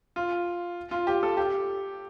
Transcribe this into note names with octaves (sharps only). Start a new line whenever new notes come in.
F4
F4
G4
A4
G4